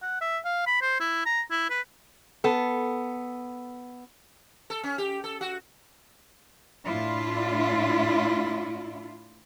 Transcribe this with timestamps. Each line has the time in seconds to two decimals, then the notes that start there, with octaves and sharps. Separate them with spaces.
0.02 F#5
0.21 E5
0.45 F5
0.67 B5
0.81 C5
1.00 E4
1.25 A#5
1.50 E4
1.70 B4
2.44 B3 A4
4.70 A4
4.83 C#4
4.98 G4
5.24 A4
5.41 F#4
6.85 A2 D4 E4 F4